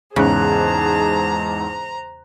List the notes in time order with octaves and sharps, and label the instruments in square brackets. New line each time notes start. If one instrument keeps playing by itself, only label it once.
[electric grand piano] E2 G#2 F#6 [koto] C#3 [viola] G#4 A5 [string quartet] C5 A#5